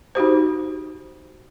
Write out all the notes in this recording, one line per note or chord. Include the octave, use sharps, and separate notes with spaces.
D#4 F#4 G4 C5